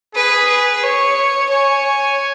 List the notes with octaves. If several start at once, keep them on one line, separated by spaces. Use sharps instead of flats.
G#4 B4
B4
C#5
C#5 G#5